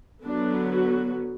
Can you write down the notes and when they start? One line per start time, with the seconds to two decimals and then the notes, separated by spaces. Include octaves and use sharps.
0.24 D3 F#3 B3 D4
0.70 F#4